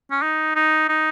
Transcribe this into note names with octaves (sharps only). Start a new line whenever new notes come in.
C#4
D#4
D#4
D#4